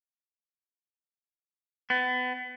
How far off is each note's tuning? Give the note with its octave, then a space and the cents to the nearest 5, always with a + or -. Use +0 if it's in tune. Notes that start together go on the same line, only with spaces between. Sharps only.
B3 +30